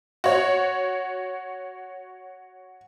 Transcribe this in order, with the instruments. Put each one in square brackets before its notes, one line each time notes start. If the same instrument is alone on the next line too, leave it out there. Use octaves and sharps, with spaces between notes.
[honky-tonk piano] F#4 C#5